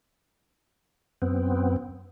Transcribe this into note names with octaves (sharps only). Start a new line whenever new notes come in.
F#2 B3 C4